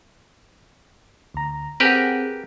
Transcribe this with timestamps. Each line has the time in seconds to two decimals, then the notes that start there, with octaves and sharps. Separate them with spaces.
1.34 D2 A#5
1.80 C4 G4 G#4 A#4 B4 F#5